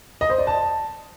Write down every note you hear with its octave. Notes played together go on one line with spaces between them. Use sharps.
D#5
C5
D5
A5